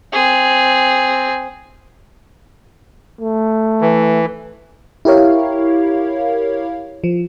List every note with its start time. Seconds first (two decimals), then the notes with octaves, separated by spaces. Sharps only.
0.13 C4 G#4
3.21 A3
3.82 E3
5.05 E4 G4 A#4 C#5 F5
7.04 F3